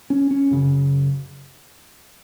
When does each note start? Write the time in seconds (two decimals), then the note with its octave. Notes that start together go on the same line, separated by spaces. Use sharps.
0.10 C#4
0.31 C#4
0.51 F#2 C#3